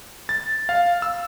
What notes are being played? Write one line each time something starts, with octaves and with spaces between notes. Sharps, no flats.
A6
F5
E6